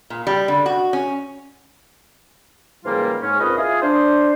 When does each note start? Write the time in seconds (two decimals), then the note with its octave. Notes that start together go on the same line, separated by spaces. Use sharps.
0.10 A#2
0.27 G3
0.48 D3
0.66 F#4
0.93 C#4
2.85 G#2 C#3 E3 G3 A#3 F4
3.22 G#2 C#4
3.40 C#2 A#2 C4 B4 D#5
3.57 E4 F4 G#4
3.82 D4 C5